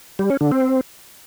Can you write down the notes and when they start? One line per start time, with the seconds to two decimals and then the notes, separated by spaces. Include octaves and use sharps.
0.19 G3
0.30 C#4
0.41 D3
0.52 C4